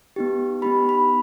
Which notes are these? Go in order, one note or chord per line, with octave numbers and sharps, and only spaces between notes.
B3 D#4 G4
B3 D#4 G4 B5
B5